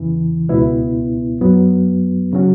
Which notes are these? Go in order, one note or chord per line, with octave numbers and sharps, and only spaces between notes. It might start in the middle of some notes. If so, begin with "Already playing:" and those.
Already playing: E2 C#3 E3
C#2 B2 B3 E4
F#2 F#3 B3
C#3 F#3 C#4 F#4